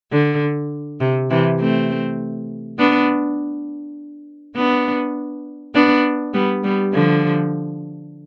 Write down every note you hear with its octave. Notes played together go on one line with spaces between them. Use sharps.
D3
C3
C3 E3
A3 C4
B3 D4
B3 D4
B3 D4
G3 B3
G3 B3
D3 F3